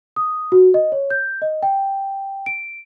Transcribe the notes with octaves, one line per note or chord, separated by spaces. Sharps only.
D#6
F#4
D#5
C#5
G6
D#5
G5
D7